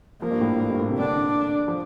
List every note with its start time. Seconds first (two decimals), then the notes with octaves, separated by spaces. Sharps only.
0.22 F3 A#3
0.31 G2
0.41 A2
0.60 A2
0.70 G2
0.80 A2
0.89 C3
0.98 D3 D4
1.68 F3